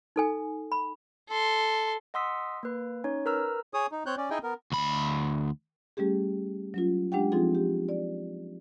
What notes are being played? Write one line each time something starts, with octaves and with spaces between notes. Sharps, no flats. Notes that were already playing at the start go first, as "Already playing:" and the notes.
D#4 A4 G#5
B5
A4 C6
D#5 F#5 C6 D#6 E6 B6
A#3 B4
C#4 D#4 C#5
A#4 B4 A#5 E6 F6
G#4 C#5 D#6
D#4
C4 C#5 F#6 G6
C#4 D5
D#4 E4 G#4 D#5 G5 G#5
B3 A#4
D2 B5
G3 A3 C#4 G4 G#4
F#3 C#4 F4
G#3 D4 G4 F#5 G5
F3 C4 D#4 F4 G#4
G4
D5